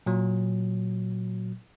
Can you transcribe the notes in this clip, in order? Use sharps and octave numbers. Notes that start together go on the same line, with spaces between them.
A#2 F#3